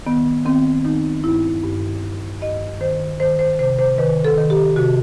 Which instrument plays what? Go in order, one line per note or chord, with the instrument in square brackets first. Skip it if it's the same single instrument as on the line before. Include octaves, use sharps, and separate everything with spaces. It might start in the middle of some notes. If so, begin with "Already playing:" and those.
[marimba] D#3 B3
D#3 C4
D#3 D#4
G2 E4
G2
G2
G2 D#5
D#3 C5
D#3 C5
C5
C3 C5
C5
D#3 B4
A4
D#3
G4
C3 F#4